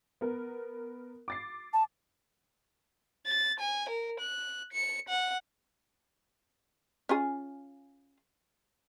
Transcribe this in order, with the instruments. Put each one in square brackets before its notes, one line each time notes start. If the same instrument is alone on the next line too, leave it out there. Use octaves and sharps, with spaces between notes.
[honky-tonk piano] B3 A#4
D6 A6 C7
[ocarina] A5
[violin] A6
G#5
A#4
F#6
C#7
F#5
[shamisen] C#4 F4 G#4